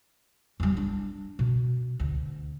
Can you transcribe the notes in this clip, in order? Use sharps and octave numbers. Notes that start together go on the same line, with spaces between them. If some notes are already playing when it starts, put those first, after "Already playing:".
E2 G3
D4
B2
D2